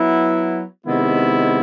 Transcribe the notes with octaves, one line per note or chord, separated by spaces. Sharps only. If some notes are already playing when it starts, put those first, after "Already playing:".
Already playing: F#3 B3 E4
C3 D#3 G#3 B3 E4